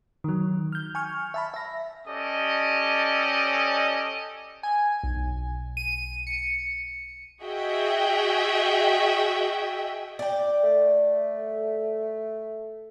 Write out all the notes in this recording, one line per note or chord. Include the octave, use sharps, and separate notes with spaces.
D#3 F#3
F6 G6
G#5 C#6 F6
E5 A5 B5
E5 A#6
C#4 G4 A4 D5 D#5
G#5
B1
D#7
C#7
F#4 G#4 D#5 E5 G5
D5 G5
A3